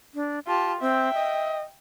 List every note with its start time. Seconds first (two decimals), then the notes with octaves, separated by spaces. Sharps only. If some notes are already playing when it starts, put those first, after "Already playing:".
0.14 D4
0.47 F4 G4 A5
0.81 C4 E5 G5
1.14 D#5